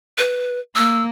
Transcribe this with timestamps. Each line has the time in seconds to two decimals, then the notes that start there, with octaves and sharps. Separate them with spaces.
0.18 B4
0.76 A#3 E6